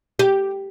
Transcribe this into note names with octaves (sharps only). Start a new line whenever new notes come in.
G4